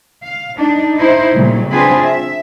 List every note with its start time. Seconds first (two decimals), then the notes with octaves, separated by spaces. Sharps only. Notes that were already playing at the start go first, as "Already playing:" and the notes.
0.23 F5
0.57 D4 D#4
0.97 D#4 E4 C5
1.33 A#2 C#3 F#3 G3 A3
1.71 C4 D4 F4 G#4 B4
2.04 E5